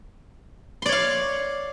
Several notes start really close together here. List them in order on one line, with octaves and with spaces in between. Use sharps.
C6 D5 C#5 F5